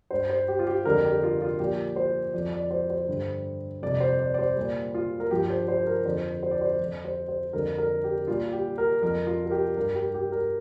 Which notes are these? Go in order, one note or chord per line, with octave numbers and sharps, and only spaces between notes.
G2 G3 C5
C5
G4
F4
G4
F2 D3 G3 A#4
G4
F4
F4
A#2 F3 G4
C5
F2 F3 D5
D5
C5
C5
G2 D3 G3
F2 C3 G3 D5
C5
D5
D5
C5
A#2 G3
F4
A#4
G2 F3 G4
C5
C5
A#4
F2 D3 F3 C5
C5
D5
C5
F2 F3
C5
C5
F2 D3 G3 A#4
A#4
G4
A#2 G3 F4
G4
A#4
F2 F3 A#4
F4
A#4
G4
G2 G3 A#4
G4
G4
A#4